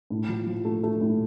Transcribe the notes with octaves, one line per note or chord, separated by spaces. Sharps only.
A2
F3
F3
A3
A3
A2